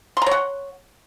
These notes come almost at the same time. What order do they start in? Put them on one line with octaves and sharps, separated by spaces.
C6 A#5 C#5 F#5